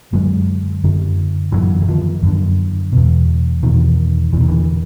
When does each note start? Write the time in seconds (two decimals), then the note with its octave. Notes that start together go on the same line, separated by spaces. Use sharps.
0.12 F#2 D3 F#3 G#3
0.84 F#2 D3
1.52 F#2 D3 E3 F#3
1.81 E3
1.88 D#3 F3
2.23 F#2 D3
2.92 E2 B2
3.63 E2 B2 D#3
4.33 E2 E3
4.37 B2 D#3
4.48 D3 E3